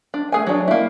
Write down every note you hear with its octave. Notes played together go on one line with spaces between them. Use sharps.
D4
A3 G#4 G#5
F#3 D4
A#3 E4